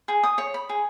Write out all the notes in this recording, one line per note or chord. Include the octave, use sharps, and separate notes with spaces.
G#4
D#6
C#5
B5
G#4